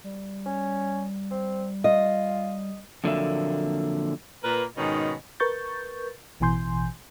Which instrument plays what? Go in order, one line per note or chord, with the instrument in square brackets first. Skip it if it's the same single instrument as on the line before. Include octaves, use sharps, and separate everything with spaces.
[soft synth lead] G3
[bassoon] C#4
C4
[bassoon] F4 [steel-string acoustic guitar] D#5
[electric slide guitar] F2 A#2 D3 F#3 A#3 E5
[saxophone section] A#2 A#3 A#4 B4
G#2 B2 D#3 C#4 D#4
[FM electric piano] A#4 B4 C#6 G6 A6
A1 B2 E3 G#5 C6 G6